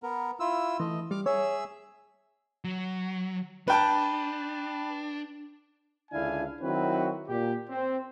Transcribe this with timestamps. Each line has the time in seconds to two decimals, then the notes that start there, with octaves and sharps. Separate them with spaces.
0.03 B3 A#4
0.40 E4 F4 E6
0.80 E3 A3 D#5
1.11 G3 D6 F6
1.26 G#4 C#5 E5 E6
2.64 F#3
3.68 D4 B4 G5 A5
6.12 C#2 D3 D4 E4 F5 G#5
6.62 D#3 F#3 C4 E4 F#4 B4
7.28 A#2 G4
7.70 C4